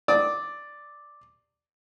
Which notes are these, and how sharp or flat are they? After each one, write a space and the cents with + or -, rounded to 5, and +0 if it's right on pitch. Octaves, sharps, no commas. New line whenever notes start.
D5 +0 D#6 +40